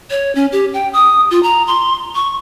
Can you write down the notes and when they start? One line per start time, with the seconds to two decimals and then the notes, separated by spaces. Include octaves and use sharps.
0.10 C#5
0.35 C#4
0.52 G4
0.74 G5
0.93 D#6
1.31 F4
1.43 A#5
1.67 C6
2.15 C#6